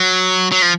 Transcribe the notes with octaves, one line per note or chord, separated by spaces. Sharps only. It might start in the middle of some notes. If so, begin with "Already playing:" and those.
Already playing: F#3
F#3
F3